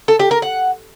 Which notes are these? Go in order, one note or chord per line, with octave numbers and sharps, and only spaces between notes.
A4
G4
A#4
F#5